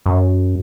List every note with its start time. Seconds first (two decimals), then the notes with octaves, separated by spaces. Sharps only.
0.06 F#2